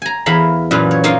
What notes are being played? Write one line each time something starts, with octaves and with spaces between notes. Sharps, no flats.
G#5 A#5
E2 E4 F5 A#5 B5
F#2 A#2 E3 B3 F4
C#5
A#3 D#4 F4 D#5 F5